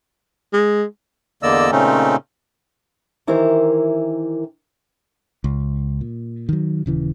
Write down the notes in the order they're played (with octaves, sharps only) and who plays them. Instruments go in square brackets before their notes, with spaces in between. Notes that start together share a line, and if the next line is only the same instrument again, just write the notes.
[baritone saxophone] G#3
[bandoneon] E2 D3 A#3 D5 D#5 E6
A#2 C#3 A3 C4 C#4 D#4
[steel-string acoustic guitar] D#3 E3 E4 G4 A#4 C5
[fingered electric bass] C#2
A#2
D#3 F#3
D#1 C#3 E3